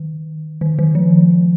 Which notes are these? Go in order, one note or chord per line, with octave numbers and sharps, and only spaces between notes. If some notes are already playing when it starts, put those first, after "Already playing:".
Already playing: D#3
D#3
D#3
F3